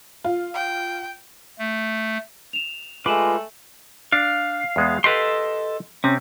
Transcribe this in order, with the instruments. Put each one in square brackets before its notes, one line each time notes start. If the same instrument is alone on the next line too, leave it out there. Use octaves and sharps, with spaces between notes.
[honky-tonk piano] F4
[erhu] G5
[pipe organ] A3
[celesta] E7 F7
[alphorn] G#3 [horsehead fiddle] A3 [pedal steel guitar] F4 B4 D6 [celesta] G#5 E7 F#7
[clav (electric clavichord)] D4 [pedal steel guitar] F5
[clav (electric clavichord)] E2 G#3 B3
[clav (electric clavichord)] G4 B4 F5 [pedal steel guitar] A4 D#5 C6
[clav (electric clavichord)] C3 C4 [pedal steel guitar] C#4